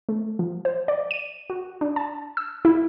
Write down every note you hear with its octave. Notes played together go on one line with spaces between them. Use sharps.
A3
F3
C5
D5
D#7
F#4
D4
A5
E6
E4